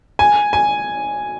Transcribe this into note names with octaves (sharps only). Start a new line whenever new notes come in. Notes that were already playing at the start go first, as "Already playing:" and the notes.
G#5
G#5